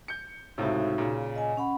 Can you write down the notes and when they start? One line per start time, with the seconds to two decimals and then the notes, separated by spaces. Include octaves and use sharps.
0.08 G6 C#7
0.58 C#2 A2 C3 D#4 F#4
0.98 A#2 C#3
1.35 D#5 G#5
1.57 C#4 F#5 B5